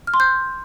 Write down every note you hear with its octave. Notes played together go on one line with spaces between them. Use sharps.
F6
C6
G6